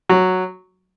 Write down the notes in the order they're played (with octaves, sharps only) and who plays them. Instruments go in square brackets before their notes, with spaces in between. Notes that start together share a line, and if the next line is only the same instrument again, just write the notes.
[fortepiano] F#3